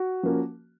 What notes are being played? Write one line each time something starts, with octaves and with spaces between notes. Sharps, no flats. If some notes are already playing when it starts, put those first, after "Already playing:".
Already playing: F#4
F3 A#3 C#4